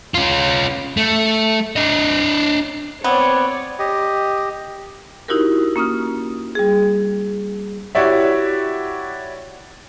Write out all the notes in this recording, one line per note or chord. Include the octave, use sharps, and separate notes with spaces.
C#4 F4
A3
D4 D#5
B3 C4 C#5 D5
G4 D#5
D#4 E4 F#4 G4 A#4
A#3 C#4 D#6 F6
G3 G#4
E4 F#4 G4 C#5 D5 E5